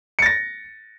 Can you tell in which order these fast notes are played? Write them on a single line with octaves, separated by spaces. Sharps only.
C#7 A6 A#6